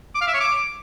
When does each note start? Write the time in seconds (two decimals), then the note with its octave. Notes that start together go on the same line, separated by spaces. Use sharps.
0.15 D6
0.21 F5
0.28 E5
0.34 C#5
0.40 D6